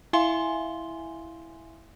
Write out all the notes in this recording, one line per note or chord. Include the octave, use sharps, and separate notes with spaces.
E4 E5 F5 G#5 C6 G7